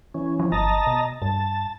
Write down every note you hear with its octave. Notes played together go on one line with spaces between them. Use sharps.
E3 C#4
F3
G1 D#5 A5 A#5
B2
G2 A5